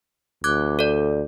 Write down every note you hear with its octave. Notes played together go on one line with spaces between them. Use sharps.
D2 D6 F#6 G#6
A4 D5